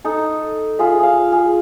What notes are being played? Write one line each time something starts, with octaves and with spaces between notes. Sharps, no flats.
D#4 A4
F4 G#4 E5
G#4 F5
G#4